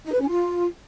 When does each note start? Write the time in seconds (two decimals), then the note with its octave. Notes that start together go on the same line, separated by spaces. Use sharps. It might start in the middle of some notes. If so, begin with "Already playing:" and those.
0.05 D#4
0.12 B4
0.20 C#4
0.27 F4